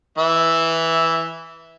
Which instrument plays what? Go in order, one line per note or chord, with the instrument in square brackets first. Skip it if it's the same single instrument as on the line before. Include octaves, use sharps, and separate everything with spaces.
[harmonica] E3 E5